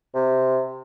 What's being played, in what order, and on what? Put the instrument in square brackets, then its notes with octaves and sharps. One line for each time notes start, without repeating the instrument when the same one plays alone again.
[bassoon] C3